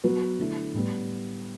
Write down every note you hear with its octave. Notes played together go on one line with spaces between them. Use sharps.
F#3 B3 F#4 B4
D3 A3 E4
A2 G3 B3